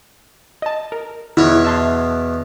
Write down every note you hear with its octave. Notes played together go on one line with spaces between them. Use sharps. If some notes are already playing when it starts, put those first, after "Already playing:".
D#5 A5
A#4
E2 B2 E4 C#5
E5 A5 C6